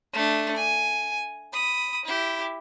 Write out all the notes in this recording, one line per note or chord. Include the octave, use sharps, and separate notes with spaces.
A3 D4
G#5
B5 D#6
E4 G4